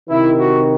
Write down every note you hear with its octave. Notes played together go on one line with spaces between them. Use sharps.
C3 D#3 E4
F#4